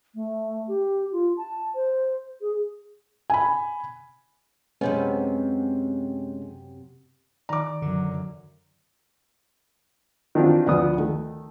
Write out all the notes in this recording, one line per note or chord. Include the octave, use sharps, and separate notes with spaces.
A3
G4
F4
A5
C5
G#4
G#5 B5
F#2 C3 G#3 B3 C#4
D#3 D5 A#5 D6
F#2 D3 F#3
D#3 E3 C4 D4 F4 F#4
D2 F3 B3 D5 D#6
D#3 A3